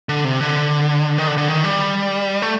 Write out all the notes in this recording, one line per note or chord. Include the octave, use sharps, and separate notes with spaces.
D3
C3
D3
D#3
D3
D3
D#3
G3
A3